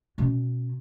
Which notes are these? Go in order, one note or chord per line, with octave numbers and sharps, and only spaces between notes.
B2 C#4